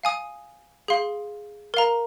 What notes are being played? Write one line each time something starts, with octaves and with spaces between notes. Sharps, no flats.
F5 G#5 D#6
G#4 F5 C6
A#4 F5 A#5